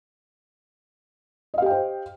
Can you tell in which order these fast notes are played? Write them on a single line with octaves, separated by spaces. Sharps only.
D#5 F5 G4 G5 C5